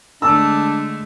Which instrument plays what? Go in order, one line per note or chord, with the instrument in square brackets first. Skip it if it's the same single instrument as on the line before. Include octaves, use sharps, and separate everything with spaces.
[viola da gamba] D3 G#3 A3 [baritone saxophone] D4 [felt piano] E6